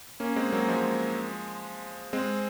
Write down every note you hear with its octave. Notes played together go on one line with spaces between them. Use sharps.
A#3 C#4
G#3 C4
F#3 A#3
F3 G#3
G#3 C4